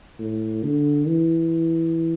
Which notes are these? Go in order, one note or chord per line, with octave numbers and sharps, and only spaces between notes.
A2
D3
E3